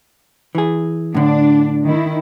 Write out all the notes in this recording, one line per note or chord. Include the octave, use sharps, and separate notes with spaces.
E3 G#4
A2 D3 D4
D#3 E4